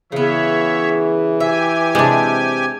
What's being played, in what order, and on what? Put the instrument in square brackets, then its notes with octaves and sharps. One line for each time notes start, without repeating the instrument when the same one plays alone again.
[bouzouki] C#3 B3 [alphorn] E3 [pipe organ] C#5 E5
[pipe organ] G4 G#5 [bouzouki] E5
[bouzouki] C3 [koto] G#3 D4